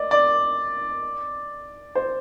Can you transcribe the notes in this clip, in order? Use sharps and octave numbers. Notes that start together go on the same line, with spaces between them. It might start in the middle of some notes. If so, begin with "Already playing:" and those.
Already playing: D5 D#5
D5
C5